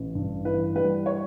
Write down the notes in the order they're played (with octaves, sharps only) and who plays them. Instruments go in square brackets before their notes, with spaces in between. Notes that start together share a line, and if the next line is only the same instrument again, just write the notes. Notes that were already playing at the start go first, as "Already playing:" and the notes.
Already playing: [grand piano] A1
G2
[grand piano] E3 [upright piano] B4
[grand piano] G3 [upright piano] B4
[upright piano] C#5